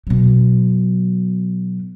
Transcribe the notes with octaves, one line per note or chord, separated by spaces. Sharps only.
B2 F#3